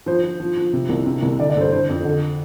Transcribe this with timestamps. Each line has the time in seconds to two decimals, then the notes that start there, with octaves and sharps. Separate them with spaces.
0.06 F3 C5
0.23 F3
0.40 F3
0.57 F3
0.73 C3
0.89 C2
1.06 C3
1.22 C2
1.39 D3 D5
1.50 D5
1.56 G2 A4
1.61 C5
1.72 D3 C5
1.89 F2
2.05 D3